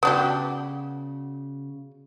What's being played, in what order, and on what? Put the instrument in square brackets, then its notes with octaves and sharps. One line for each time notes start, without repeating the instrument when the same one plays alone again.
[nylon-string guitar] C#3 F#4 [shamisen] B3 D4 G4